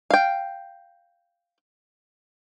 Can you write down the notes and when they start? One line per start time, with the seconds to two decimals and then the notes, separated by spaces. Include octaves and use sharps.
0.10 F5 G5